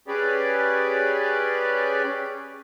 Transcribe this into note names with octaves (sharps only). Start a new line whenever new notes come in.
C#4 G4 G#4 B4 D5